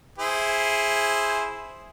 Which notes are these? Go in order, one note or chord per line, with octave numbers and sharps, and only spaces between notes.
E4 G#4 C5